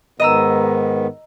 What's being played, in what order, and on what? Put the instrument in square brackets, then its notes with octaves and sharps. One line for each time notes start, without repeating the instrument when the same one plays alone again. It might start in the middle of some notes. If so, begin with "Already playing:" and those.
[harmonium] G#2 D#3 B3 [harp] D#5 A#5 E6